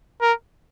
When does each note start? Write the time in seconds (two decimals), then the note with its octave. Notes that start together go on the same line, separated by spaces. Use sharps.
0.22 A#4